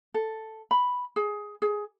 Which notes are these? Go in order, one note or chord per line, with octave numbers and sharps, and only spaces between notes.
A4
B5
G#4
G#4